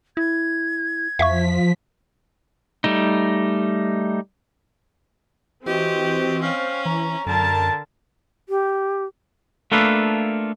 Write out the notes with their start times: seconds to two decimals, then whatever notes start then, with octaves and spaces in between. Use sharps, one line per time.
0.17 E4 G#6
1.19 F2 F3 E5 F5 C#6 B6
2.84 G3 A3 D#4
5.66 E3 C4 F#4 G4 D#5
6.42 C#4 F5
6.86 E3 A#5
7.27 F#2 D3 A#4 A5
8.49 G4
9.72 A3 A#3 D4 F4 A4 B4